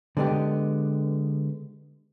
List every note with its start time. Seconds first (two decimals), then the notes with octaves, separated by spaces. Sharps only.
0.17 D3 G#3 B3 G4